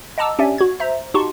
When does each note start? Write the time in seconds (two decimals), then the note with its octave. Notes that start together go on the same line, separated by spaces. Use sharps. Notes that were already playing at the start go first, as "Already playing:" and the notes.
0.18 D#5 F#5 A5 A#5 D6 E6
0.39 C#4 D4 G4 D5 E5 G#5
0.58 F#4 G#6
0.80 C5 E5 A#5
1.14 D#4 F#4 G4 A5 C6 C#6